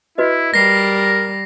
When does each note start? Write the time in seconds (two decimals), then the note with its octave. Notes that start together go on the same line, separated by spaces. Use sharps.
0.18 E4 F#4 B4 D#5
0.54 G3 A#4 A#6 C7